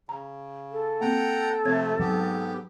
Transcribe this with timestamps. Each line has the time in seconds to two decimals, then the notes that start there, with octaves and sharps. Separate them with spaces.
0.09 C#3 A#5
0.72 A4
1.01 A#3 C4 F#5 G5 A#5
1.65 C3 F3 A3 C4 C#5 G#6
1.99 G#2 F#3 B3 G4